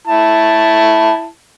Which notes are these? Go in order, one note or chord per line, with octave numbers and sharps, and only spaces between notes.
E4 A5